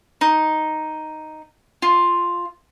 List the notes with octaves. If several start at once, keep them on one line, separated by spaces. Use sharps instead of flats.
D#4
F4